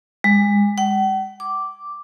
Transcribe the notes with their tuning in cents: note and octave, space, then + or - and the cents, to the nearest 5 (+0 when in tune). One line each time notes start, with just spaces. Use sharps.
G#3 -30
F#5 +45
D6 -5